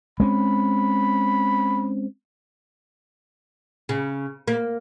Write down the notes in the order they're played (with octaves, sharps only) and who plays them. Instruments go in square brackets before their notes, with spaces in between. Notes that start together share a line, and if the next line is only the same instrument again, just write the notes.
[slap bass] G#3 C4 C#4 [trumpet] B5
[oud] C#3
A#3